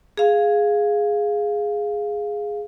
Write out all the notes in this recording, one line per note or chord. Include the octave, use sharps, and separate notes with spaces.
G#4 F5